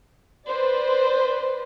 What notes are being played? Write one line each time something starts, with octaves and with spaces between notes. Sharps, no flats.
B4 C5 D5